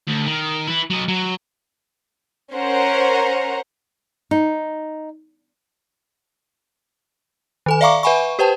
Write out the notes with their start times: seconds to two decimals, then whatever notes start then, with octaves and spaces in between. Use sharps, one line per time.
0.07 D2
0.26 D#3
0.67 E4 B4
0.90 F#3 D#5
1.08 F#3
2.53 C#4 A#4 C5 F#5 A#5
4.31 D#4
7.66 D#3 A4 G#5
7.81 D5 E5 F5 A#5 C#6 D6
8.03 B4 E5 F#5 G#5 B5 C#6
8.39 G4 B4 C5 G5 A5